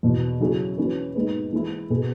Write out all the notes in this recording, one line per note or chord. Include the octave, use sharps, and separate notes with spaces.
E2 B2 B3
C#3 F#3 C#4 E4 G#4
E3 C#4 F#4 B4
G#2 G#3 B3
E3 G#3 E4
B2 B3 G#4